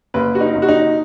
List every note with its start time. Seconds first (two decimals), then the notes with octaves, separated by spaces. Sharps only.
0.14 F#1 B4
0.35 F#4
0.41 D#4
0.55 F#1
0.62 F#4
0.69 D#4